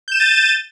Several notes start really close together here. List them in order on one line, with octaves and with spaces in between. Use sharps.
G6 E7 D#7 A6